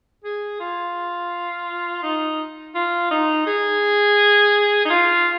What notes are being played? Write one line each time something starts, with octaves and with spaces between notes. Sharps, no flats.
G#4
F4
D#4
F4
D#4
G#4
D#4
F4